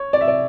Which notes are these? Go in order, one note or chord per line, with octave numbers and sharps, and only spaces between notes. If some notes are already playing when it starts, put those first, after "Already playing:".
Already playing: C#5
D5
E5
D5